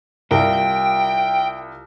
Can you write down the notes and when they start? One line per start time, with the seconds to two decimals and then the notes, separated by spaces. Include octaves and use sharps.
0.31 C2 F4 A#4 G5